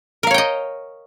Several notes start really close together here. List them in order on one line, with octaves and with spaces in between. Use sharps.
A#4 F5 C#5 G5 D#5